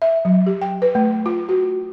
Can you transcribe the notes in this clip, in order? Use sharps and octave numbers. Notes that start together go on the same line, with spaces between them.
E5
F#3
G4
G5
B4
A3
F4
F#4